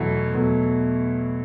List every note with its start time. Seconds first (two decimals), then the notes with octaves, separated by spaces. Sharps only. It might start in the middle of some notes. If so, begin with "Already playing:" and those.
Already playing: E2 B2 F#3 A3 E4
0.34 E2 B2 F#3 A3